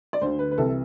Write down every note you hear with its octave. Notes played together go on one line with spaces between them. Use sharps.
D5
D2 D3 C5
B4
B4
C2 C3 E3 A4